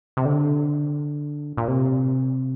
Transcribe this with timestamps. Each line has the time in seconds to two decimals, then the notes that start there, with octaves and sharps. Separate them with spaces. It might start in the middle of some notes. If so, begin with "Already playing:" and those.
0.17 C3
0.25 D3
1.57 A#2
1.68 C3